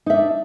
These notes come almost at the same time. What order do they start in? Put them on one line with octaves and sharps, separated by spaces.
D#4 E5 D4